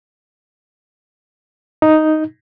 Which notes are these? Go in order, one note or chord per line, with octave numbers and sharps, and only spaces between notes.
D#4